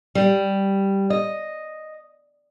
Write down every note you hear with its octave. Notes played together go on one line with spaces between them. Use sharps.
G3
D#5